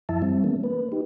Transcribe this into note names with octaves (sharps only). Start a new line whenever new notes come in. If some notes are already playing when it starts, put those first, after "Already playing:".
F#2 F3 E4 E5 A5
G3 C4
E3 G#3 A#3 B3 C#4
A#3 B4
D#4 G4